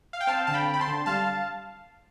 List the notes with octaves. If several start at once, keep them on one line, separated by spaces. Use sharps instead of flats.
F5
G5
C4 F5 A5
D3 A5
G5 B5
C4
B5
A5 C6
D3
G3 F5 A5